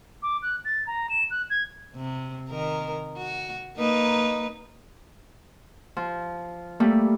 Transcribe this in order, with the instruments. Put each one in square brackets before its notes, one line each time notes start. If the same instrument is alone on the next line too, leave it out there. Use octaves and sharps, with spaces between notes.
[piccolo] D6
F#6
A6
A#5
E7
F#6
G#6
[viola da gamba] C3
D#3 A#4
F#4
A#3 D#4 B4
[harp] F3
G3 A3 A#3